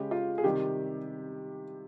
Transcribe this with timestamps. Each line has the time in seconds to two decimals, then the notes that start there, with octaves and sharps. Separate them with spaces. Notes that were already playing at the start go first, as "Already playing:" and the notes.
Already playing: C#3 G#3 G4
0.11 F4
0.38 G#4
0.43 C3 D#3 G3 G4